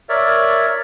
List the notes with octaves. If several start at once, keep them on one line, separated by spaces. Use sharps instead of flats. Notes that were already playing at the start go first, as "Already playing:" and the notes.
A#4 C#5 D5 E5